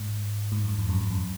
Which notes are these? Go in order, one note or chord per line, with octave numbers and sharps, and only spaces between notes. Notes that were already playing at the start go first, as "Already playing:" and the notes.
Already playing: G#2
G#2
F#2
F2
F#2
F2